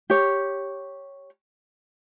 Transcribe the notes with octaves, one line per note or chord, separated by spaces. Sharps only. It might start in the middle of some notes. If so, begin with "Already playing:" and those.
G4 C#5